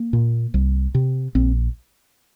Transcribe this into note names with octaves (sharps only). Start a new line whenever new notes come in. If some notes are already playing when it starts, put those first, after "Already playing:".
Already playing: A#3
A#2
C2
C3
A#1 C4